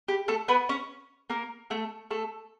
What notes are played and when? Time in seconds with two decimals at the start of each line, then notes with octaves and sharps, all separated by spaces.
0.08 G4
0.28 A3 A4
0.48 B3 B4
0.69 C#4 C#5
1.30 A#3 A#4
1.70 A3 A4
2.11 A3 A4